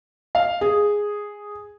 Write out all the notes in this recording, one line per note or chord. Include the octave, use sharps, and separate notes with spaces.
F5
G#4